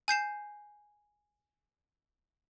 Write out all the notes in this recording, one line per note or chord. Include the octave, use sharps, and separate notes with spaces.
G#5 G6 C7 E7